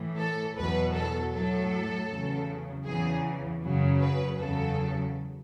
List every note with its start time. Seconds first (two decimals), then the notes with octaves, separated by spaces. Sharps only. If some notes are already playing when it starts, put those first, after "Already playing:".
Already playing: A2 E3
0.18 A4
0.57 E2 B2 F#3 B4
0.95 A4
1.33 A2 F#3 A4
2.09 E2 C#3 F#3
2.85 E2 C#3 E3 G#4
3.61 F#2 C#3 F#3
3.99 B4
4.37 E2 C#3 F#3 A4